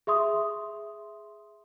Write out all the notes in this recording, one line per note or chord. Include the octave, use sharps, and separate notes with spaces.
G#4 E5 C6 D#6